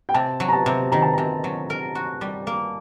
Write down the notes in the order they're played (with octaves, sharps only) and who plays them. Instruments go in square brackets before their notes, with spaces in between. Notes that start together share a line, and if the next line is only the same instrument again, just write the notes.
[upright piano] G5
[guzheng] C3 [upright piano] A5
[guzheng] F#3
[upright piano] A#5
A5
[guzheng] C3
[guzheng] D#3 [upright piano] A#5
[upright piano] A5
[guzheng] C3 [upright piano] A#5
[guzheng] F#3
A#4
F#4
G3
A#3